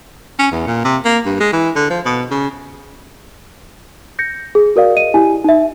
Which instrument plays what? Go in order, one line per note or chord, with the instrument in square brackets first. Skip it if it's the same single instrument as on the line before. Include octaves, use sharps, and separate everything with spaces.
[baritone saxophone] C#4
E2
A#2
C3
A#3
G2
G#3
E3
D3
F3
B2
C#3
[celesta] G6 A#6 C#7
G#4
F#4 A#4 D5 F5
D#5 D#7
E4 G4 G#5
D#4 E5